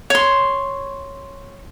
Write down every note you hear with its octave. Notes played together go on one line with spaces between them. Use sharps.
C#5 C6